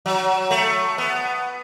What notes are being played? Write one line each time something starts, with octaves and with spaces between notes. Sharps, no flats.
F#3
A3
B3